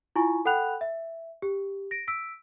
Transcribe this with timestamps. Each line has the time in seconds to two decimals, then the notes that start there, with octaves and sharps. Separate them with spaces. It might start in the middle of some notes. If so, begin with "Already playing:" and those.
0.16 E4 F4 G#5 C#6
0.45 A4 F#5 G5 B5 F#6 F7
0.81 E5
1.42 G4
1.91 A#6 D7
2.07 E6 B6 D7